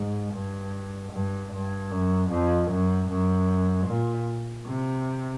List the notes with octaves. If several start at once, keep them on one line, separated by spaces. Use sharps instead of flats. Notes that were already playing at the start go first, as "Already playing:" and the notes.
Already playing: G#2
G2
G2
G2
F#2
F2
F#2
F#2
A#2
C3